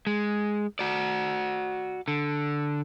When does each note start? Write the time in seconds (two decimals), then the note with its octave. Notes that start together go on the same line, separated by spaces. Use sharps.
0.07 G#3
0.79 F#4 D5
2.08 D3